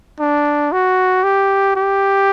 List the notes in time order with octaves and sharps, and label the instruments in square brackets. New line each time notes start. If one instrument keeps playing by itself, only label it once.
[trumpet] D4
F#4
G4
G4